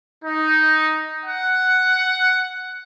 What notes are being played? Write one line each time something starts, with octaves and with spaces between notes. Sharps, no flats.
D#4
F#5